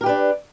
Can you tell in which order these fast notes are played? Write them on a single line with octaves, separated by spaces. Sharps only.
A#4 G4 B4 D4